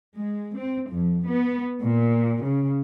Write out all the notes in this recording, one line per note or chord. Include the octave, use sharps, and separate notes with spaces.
G#3
C4
F2
B3
A#2
C#3